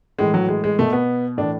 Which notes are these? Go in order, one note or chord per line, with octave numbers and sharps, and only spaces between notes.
A2 E3 G#3
F#3
G#3
G#3
B2 A3
B3
A2 E3 D4